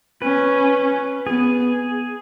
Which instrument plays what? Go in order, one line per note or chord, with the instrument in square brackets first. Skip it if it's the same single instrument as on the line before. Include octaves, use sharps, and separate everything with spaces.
[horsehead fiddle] C#4 [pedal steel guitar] B4
[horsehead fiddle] B3 [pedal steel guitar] G#4